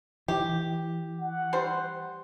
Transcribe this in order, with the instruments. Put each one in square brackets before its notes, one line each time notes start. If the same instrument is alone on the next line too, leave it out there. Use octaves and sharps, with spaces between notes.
[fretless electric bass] E3 [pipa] G4
[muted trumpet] F#5
[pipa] G3 C5